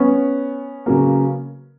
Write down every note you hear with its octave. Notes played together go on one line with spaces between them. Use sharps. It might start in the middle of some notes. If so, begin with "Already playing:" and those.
Already playing: B3 C#4
C#3 F#3 A#3